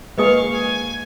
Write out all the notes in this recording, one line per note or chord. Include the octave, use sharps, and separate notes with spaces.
G#3 A#3 G#4 B4 D#5 F5 C#6 D#6
G#5